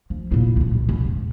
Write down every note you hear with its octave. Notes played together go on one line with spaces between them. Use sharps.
F3
A#2 E4
D2 A2
C2
D#2 B2
E2 G#2